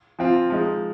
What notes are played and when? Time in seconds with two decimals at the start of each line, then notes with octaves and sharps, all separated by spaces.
0.19 F3 C4 F4
0.50 F3 G#3 D#4